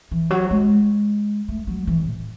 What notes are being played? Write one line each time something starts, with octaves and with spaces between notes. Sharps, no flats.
E3
F#3
G#3
A3
F#3
E3
A2